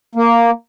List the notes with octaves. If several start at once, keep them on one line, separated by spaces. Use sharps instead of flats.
A#3